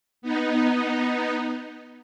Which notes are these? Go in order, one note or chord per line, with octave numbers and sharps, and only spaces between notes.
B3 D#4